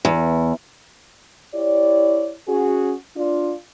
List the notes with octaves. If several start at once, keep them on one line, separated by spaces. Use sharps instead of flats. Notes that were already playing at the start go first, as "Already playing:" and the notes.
E2
E4 G4 C#5 D5
C#4 F#4 G#4
D4 F4 D5